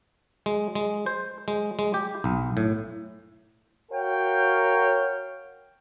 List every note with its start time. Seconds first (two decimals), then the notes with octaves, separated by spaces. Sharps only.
0.46 G#3
0.75 G#3
1.06 C5
1.48 G#3
1.79 G#3
1.94 G4
2.24 B1
2.57 A2
3.91 F#4 A#4 C#5 F5 G5